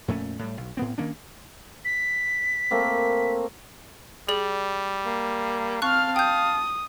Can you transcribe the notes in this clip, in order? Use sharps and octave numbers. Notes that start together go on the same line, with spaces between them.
F2 A#2 A3 C#4
A2 G3
B1
A2 B3 C4
D#3 A#3 C#4 D4
B6
A3 A#3 C4
G3 G#4 D5 F#7
A#3
C4 F5 A5 C#6 F6 F#6
G5 D#6 G6